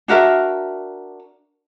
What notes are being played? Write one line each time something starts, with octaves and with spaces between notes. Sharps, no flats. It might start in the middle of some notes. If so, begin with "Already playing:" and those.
D4 F#4 A#4 E5